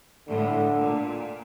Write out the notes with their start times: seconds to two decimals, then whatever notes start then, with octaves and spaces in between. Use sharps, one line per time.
0.28 A2 D3
0.73 A#2